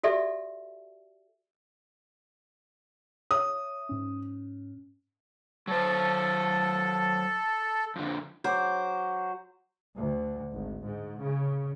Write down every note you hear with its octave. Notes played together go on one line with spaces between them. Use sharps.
F#4 G4 A4 D5 E5
C#5 E5 D#6
G#2 C#4
F#3 A4 C5
F2 D3
F#3 C5 D6
D2
G#1
G#2
C#3